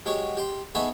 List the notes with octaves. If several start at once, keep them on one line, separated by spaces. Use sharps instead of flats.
F#3 G#3 G4 C#5 D6
G4 G5 C6
B3 D#4 G#4 A4 C#5 E5